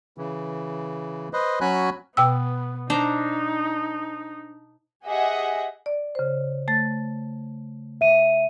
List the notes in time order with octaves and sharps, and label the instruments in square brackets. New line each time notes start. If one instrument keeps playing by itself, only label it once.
[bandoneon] C#3 E3
B4 C5 D#5
F#3 C#4 F#4 G#5 B5 F#6
[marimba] B2 G5 E6 [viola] B3
[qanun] D4 C5 A#5 [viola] D#4
[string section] G4 G#4 D#5 E5 F#5
[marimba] D5
C#3 C5
A3 A6
[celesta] E5 D#7